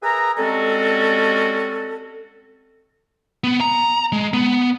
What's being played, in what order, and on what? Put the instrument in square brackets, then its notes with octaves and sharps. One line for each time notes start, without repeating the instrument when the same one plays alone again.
[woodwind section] G#4 A#4 B4 E5 A#5
G3 G#3 C4 C#4 F#4 A4
[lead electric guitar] B3
A#5
G#3
B3